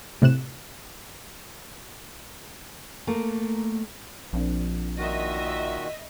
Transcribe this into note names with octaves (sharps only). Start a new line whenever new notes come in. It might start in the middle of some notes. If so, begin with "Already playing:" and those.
A2 C3 F#6 E7
A3 A#3 A#4
A#1 F3 C4 D4
A#2 D#3 F#4 D#5 E5